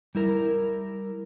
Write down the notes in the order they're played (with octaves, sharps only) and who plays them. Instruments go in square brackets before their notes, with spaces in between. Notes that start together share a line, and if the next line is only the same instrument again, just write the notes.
[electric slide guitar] G3 E4 A#4